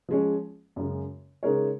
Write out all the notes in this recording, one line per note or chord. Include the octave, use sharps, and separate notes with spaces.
F3 G#3 C#4
F#2 C#3 G#3
C#3 G#3 D#4 A#4 C#5